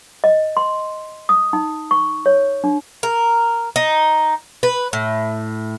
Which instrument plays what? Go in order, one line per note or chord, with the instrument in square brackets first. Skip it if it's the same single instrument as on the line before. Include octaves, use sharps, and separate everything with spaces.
[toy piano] D#5
C6
D#6
D#4
C#6
C#5
D4
[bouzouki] A#4
D#4
B4
A2